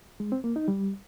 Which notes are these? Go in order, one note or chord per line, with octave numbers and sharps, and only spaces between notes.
G#3
C4
A#3
D#4
G3